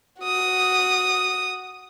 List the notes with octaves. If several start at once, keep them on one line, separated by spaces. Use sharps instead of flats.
F#4 D#6